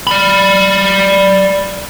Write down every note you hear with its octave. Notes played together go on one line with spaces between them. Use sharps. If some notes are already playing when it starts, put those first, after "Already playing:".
D5 B5